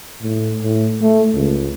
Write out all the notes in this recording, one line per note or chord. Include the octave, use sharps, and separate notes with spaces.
A2
A2
A3
C#2